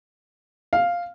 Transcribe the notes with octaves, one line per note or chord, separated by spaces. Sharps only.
F5